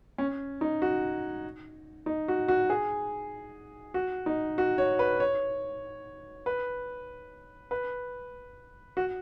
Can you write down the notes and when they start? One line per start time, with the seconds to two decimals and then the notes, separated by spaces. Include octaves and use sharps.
0.18 C#4
0.61 D#4
0.82 F#4
2.06 D#4
2.28 F#4
2.48 F#4
2.70 G#4
3.94 F#4
4.26 D#4
4.58 F#4
4.78 C#5
4.99 B4
5.20 C#5
6.46 B4
7.71 B4
8.97 F#4